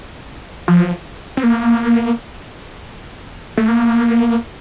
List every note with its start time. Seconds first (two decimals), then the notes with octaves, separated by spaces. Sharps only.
0.68 F3
1.37 C4
1.43 A#3
3.57 A3
3.68 A#3